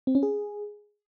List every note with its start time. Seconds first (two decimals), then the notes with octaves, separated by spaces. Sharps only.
0.07 C4
0.15 C#4
0.23 G#4